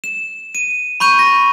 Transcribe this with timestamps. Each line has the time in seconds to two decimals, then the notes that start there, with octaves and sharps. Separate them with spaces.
0.04 E7
0.55 D#7
1.00 B5 C#6 G6 D#7
1.19 A#6